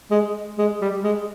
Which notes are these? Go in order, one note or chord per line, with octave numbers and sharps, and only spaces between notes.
G#3
G#3
G3
G#3